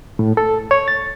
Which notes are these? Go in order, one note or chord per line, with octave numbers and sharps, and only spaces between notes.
A2
A4
C#5
A6